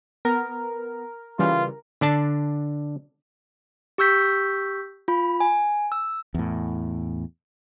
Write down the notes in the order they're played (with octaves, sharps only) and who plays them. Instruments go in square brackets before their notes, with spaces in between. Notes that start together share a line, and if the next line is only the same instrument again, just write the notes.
[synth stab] B3 [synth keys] A#4
[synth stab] C#3 E3 G3 [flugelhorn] F4
[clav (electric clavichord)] D3 D4 A5
[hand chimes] G4 C#6 E6 G6 B6
F4 B5
G#5
E6
[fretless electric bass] E2 A2